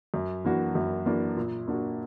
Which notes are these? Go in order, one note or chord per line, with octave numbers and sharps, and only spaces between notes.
F#2
E3 A#3 D4 F#4
F#2
E3 A#3 D4 F#4
A#2
A#3 D4 F#4